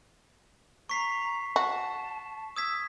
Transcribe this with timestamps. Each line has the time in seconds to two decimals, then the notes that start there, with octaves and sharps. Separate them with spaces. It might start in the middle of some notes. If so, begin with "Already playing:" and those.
0.89 A#5 C#6 B6 C7
1.56 F#4 A5
2.56 D#6 E6 G#6 B6